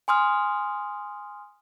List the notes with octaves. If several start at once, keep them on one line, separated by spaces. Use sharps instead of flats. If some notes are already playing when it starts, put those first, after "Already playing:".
G#5 C6 D#6 F6